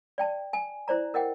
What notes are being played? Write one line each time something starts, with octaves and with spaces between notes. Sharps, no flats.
D5 G5 A5
G#5
E4 C5 D5 A#5
A#4 D#5 F#5 G5